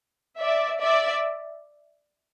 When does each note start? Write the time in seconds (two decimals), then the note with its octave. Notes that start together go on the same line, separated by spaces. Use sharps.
0.41 D5 E5
0.80 D5 E5